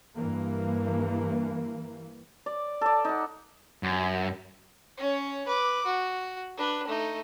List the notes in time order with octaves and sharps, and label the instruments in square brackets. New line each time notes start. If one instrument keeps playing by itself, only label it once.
[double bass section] G2 E3 A#3
[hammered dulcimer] D5
A4 D5
D#4 F#5
[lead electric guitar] F#2
[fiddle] C#4 C#5
B4 D6
F#4
D4 B4
A3 D#4